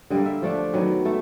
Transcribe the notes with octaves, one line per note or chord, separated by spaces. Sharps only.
D3 G3 A#3 D#5
E5
F3 A3 D4
D#3 F#3 B3 E5
A3 E5